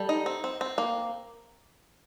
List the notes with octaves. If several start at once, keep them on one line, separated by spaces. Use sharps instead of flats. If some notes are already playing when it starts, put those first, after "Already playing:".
Already playing: G3 A4
D#4
C4
C4
C4
A#3